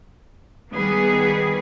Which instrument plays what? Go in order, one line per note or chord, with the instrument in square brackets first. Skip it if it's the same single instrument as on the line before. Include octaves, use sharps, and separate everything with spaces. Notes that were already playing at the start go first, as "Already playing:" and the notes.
[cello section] D#3 G3 B3 G#4 B4